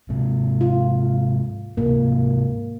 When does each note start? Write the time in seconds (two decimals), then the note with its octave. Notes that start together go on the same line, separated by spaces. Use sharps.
0.09 G#2 C3
0.61 F4
1.77 G#2 C3 E3 A#3